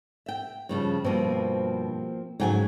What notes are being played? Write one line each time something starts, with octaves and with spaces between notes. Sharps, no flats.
E5 G5
G2 C#3 F3
G2 B2 F3 A#3 C4
G#2 C#3 F3 F#3 G5 G#5